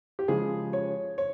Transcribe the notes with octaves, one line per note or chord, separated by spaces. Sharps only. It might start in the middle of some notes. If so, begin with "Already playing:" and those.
G4
C#3 F3 G#3 G#4
C#5
C#5